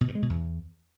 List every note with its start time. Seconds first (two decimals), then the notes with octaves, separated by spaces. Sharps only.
0.01 B2
0.08 G2
0.15 G#3
0.22 B2
0.29 E2